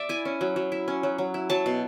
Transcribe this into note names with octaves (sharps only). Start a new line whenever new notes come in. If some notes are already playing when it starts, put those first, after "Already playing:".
Already playing: D5 E5
E4 G#5
C#4
F#3
F#3
E4
C#4
F#3
F#3
E4
F#3 A5
B2